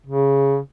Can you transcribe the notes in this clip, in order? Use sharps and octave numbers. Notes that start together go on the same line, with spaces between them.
C#3